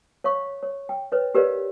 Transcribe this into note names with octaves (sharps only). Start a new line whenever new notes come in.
C#5 F5 C#6
C#5
G5
B4 C#5 D#5
G4 A#4 B4 C#5 D5 F5